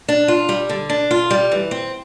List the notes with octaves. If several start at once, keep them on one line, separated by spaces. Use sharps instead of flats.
D4
F4
G3
D3
D4
F4
G3
E3
C4